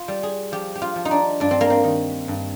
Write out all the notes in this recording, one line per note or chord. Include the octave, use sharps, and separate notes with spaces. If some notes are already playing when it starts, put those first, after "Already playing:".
Already playing: F4
G3
G#4
F3 G4
G4
F4
F3
D#4
D4
G2 D4
C4
A#3
C4
D#3
G2